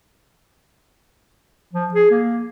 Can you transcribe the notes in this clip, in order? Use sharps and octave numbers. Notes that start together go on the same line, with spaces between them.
F3
G#4
A#3